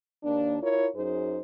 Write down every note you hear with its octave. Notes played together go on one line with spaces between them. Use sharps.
D#2 A#3 D4
E4 F4 A#4 C#5
F#2 D#4 G#4 C5